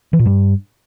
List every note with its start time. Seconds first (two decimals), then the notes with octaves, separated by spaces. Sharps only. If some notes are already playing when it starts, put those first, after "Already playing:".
0.13 E3
0.19 A#2
0.25 G2